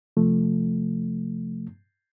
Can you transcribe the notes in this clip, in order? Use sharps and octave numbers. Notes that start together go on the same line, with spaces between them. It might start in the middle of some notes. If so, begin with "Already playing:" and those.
C3 F3 A3